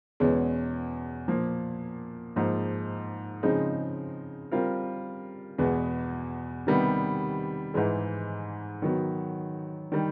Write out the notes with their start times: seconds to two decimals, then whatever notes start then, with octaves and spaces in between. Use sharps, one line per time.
0.20 E2 B2 G#3 C#4
1.28 A#2 F3 A#3
2.36 G#2 F3 A#3
3.43 C#3 F3 G#3 C4 D#4
4.52 G3 C4 F4 A#4
5.58 E2 B2 G#3 B3
6.67 C3 D#3 G3 B3
7.74 G#2 E3 G#3
8.82 D#3 F#3 B3
9.92 D#3 G3